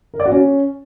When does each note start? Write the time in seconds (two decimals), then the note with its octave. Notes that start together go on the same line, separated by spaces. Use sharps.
0.14 A#4
0.20 D5
0.26 F#4
0.32 C#4